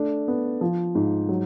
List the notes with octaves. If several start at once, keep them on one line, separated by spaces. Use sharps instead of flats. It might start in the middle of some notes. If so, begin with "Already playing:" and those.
Already playing: A3 D4
B3
F3
G#2
F#3